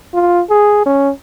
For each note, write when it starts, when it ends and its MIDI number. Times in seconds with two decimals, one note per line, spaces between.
0.14 0.41 65
0.50 0.82 68
0.86 1.10 61